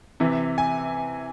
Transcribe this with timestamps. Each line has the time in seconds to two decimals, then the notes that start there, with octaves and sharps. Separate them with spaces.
0.20 C3 E3
0.58 G#5